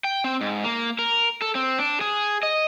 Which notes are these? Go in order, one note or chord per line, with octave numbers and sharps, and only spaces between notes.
G5
C4
G#2
A#3
A#4
A4
C4
D4
G#4
D#5